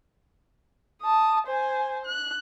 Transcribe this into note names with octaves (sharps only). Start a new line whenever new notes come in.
A5 D#6
C5 G#5
F#6